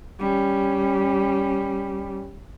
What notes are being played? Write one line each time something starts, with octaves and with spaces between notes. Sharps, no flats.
G3 C#4